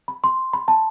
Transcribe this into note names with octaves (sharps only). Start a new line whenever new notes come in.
B5
C6
B5
A5